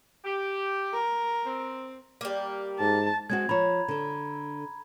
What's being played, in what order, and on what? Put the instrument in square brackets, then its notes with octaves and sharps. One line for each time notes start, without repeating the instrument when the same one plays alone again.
[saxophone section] G4
[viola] A#4
[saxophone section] C4
[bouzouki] G3 A#3
[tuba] G#2 [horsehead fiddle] A5
[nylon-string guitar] G#3 C4 F#4 [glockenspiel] G#6
[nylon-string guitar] F3 C#5 [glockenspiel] A#5 B5
[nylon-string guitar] D3 A4